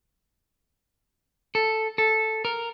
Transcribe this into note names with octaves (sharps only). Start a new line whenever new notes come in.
A4
A4
A#4